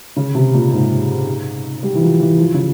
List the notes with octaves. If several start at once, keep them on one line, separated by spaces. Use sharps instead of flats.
C#3
C3
A#2
G#2
G3
E3
F3
E3
F3
C#3